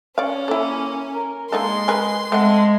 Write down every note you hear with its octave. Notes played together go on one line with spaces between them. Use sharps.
C#4 C#5 D5 F5
A#3 E4 A4
A#4
G#3 A#3 D#4 A4 C6
G#4 A#4 B4
G#3 A3 C4 A4 F#5